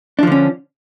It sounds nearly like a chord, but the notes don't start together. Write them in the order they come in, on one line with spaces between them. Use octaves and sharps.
D4 F3 D3 C#4